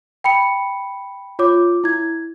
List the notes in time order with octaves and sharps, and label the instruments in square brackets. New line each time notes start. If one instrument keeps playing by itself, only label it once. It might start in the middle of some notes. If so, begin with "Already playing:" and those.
[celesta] G5 B5 C#7
F4 C#5 D6
E4 G#6